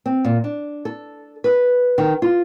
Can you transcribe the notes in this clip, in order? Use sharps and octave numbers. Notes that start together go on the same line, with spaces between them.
C4
A#2
D4
A4
B4
D#3
F4